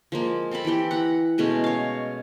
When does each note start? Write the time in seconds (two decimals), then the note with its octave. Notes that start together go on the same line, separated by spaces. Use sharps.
0.12 F3 G#3 A#3
0.51 C4 A4 A5 B5
0.65 E3 E4 G4 G5
0.91 F#5 A#5 B5
1.38 B2 G#3 A3 C#4
1.64 C#5 F5